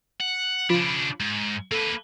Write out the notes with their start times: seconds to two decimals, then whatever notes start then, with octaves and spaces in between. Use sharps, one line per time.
0.20 F#5
0.70 C#3 F3 D4 F4 B5
1.20 G#2
1.72 A#3 A4 B4